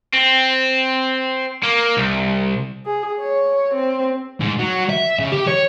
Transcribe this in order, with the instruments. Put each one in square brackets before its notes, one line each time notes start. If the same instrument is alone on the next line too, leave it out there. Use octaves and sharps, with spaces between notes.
[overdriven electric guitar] C4
A#3
C2
[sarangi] G#4
C#5
C4
[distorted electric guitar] G#2
F#3
E5
C#3
G4
C#5